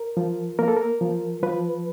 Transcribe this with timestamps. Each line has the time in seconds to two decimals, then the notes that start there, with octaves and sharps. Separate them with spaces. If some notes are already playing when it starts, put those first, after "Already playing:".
Already playing: A#4
0.17 F3
0.59 A#3 A#4
0.68 A4
0.77 A#4
1.01 F3
1.43 F3 B4